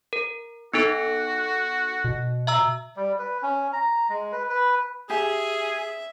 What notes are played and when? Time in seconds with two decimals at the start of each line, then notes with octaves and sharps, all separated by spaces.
0.13 A#4
0.74 B3 D#4 F#4 A4
2.04 B2
2.47 E5 A#5 E6
2.96 G3
3.19 B4
3.43 C#4
3.73 A#5
4.09 G#3
4.32 B4
4.49 B4
5.10 G4 G#4 E5 G#5